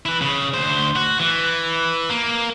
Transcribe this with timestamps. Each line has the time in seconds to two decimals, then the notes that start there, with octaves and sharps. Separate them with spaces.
0.06 E4 B4
0.21 C#3
0.54 D2 C5
0.96 F#4
1.20 E3
2.10 A#3